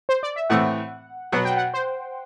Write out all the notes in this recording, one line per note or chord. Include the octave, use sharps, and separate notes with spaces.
C5
D5
E5
A2 E3 A3 C4 F#5
B2 F#3 B3 F#5
G5
F#5
C5